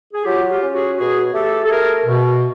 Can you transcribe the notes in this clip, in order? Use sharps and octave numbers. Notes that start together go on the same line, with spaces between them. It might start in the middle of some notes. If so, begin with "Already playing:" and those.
G#4
F#3 F4 G4
F4 G4
C#4
F#4 G#4
B2 F#4 G#4
A3 G4 A4
A4
A3 G#4 A#4
B2